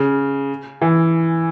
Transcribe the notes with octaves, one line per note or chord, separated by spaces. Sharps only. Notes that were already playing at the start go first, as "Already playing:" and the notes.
Already playing: C#3
E3